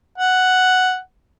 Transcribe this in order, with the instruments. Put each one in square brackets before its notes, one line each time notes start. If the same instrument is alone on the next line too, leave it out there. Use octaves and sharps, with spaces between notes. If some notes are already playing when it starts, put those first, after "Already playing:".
[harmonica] F#5